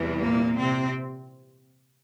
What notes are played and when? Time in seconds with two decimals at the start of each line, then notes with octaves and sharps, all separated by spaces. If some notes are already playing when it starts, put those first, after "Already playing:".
Already playing: E2 C3 E3 G3
0.22 A#2 A#3
0.56 C3 C4